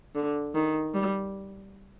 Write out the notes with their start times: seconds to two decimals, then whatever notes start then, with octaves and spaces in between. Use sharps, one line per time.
0.15 D3
0.55 D#3
0.94 G3